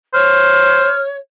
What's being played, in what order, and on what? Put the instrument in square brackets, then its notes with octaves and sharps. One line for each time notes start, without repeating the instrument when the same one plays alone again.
[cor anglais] C5 [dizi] C#5 [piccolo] F6